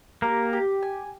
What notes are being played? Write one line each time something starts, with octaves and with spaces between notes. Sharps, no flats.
A#3 G4 A#4
G4
G#5